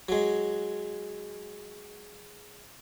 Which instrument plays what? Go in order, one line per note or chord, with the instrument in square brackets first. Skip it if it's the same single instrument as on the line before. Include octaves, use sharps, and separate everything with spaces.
[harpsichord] F#3 G#3